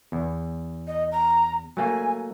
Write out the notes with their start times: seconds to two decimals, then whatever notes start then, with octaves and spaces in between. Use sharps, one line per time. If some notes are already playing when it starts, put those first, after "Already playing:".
0.12 E2
0.87 D#5
1.12 A#5
1.77 F#3 A3 A#3 G#5